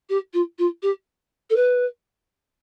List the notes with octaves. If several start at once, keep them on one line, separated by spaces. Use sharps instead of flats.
G4
F4
F4
G4
A4
B4